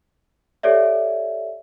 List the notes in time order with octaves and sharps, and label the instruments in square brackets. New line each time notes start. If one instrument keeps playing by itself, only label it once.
[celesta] G4 A4 C#5 D5 E5